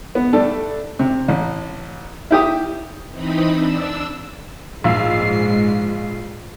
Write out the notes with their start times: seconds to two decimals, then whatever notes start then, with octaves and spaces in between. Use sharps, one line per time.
0.15 B3
0.33 G3 A3 D4 A4
0.99 C3
1.28 A1
2.31 E4 G4 D#6
3.11 E3 C4 D#4 B5 D#6
3.52 D4 E6
4.84 A#1 G#2 G#3 F5 E6 C7